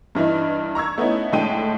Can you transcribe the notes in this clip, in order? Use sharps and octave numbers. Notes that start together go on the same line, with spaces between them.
G2 E3 D#4 E4
A#5 C#6 E6 G#6
A3 B3 C#4 D#4 E4
A2 D3 G#3 G5 A5 D#7